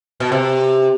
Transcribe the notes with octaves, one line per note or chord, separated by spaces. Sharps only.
B2
C3